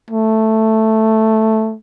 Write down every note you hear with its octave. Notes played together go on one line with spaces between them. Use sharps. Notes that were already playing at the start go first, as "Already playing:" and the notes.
A3